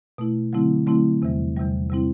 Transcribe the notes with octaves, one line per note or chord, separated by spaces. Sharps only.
B2 A3 E4
D3 F#3 A3 C4 E4
D3 F#3 A3 C4 E4
E2 C3 E3 G3
E2 C3 E3 G3
C3 G3 C4 E4